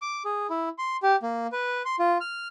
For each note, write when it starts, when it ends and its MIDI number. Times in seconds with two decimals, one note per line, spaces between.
0.02 0.23 86
0.25 0.47 68
0.50 0.69 64
0.78 0.97 84
1.03 1.16 67
1.23 1.47 58
1.52 1.82 71
1.85 1.96 84
1.99 2.18 65
2.21 2.48 89